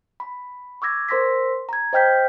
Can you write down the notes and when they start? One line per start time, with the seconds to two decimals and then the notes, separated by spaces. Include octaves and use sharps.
0.20 B5
0.82 C#6 D6 E6 G#6 A#6
1.09 A#4 C5 C6 E6 A#6 B6
1.69 A#5 G#6
1.93 C5 D#5 G5 F6 G6 B6